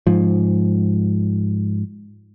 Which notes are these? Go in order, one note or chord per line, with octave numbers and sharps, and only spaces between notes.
G#2 F3